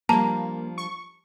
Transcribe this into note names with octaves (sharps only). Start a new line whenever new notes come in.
F3 G3 A#3 D4 A5 A#5
C#6